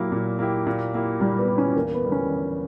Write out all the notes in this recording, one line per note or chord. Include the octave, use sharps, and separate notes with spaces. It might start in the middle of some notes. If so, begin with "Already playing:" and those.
Already playing: A#2 F#3 A#3 E4 G4
A#2
A#3 E4 G4
A#2
A#3 E4 G4
A#2 G3
B3
A#3 E4 G4
C#4
E2 A#3
B3
D3 G3
C#4
E2